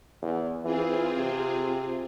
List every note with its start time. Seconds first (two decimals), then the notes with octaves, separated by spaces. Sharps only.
0.22 E2
0.65 E3 C4 F4 G#4
1.17 C3